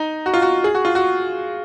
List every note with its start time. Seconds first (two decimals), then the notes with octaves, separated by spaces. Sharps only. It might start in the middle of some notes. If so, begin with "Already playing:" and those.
Already playing: D#4
0.26 F#4
0.33 F4
0.42 F#4
0.64 G#4
0.75 F#4
0.85 F4
0.95 F#4